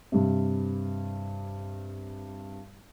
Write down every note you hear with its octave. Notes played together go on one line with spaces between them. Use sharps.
G2 C3